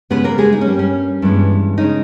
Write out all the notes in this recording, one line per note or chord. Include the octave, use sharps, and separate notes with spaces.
C#3 G#3 B3 C#4 B4
A#3 A#4
G#3 G#4
D#4
C#4
G2 G3 A#3
C#4
G2 E3 G#3 B3
C#3 G#3 C#4 D#4